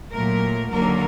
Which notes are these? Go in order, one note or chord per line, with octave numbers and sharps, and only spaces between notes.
A#2 F#3 A3 A#4
D#2 D3 F#3 A#3 A#4